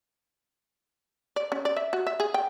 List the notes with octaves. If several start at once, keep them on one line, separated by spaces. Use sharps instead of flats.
D5
C#4
D5
E5
F#4
E5
G#4
G5